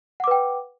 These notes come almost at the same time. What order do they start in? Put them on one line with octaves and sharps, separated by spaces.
F#5 D6 B4 G5